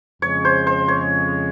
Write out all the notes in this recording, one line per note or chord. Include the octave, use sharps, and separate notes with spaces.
F2 C#3 G#3 C#5
C5
C5
C#5